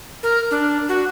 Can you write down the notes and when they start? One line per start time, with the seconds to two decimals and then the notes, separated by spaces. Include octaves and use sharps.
0.23 A#4
0.51 D4
0.89 F#4